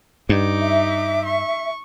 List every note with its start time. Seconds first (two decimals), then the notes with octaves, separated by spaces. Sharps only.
0.29 G2 D#4 D6
0.61 E5
1.26 C#6